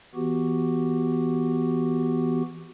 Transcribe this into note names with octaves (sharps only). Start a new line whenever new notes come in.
E3 B3 F#4 G4